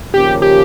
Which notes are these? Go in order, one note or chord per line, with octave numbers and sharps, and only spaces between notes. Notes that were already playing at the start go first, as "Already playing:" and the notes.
D#2 C#3 F3 A#3 C#4 G4
G4